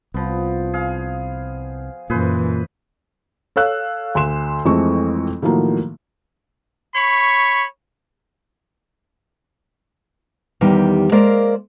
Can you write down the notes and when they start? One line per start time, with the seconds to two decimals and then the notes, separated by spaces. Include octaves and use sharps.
0.14 C2 F3 B3
0.74 G#4 F5
2.10 F#2 A#2 E3 G#4 B4 C5
3.56 A4 C#5 F5 E6 F#6
4.15 D2 C6 E7
4.65 F2 E3 G#3 A3 C4 C#6
5.42 A2 D#3 F3 F#3 A#3
6.95 C#5 B5 C#6
10.61 E2 D#3 G3 G4
11.12 G#3 A#3 A#4 C5 D5 F5